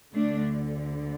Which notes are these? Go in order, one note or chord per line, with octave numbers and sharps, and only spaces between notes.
D2 D3 A3 D4